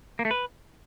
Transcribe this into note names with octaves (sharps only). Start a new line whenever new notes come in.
A#3
A3
B4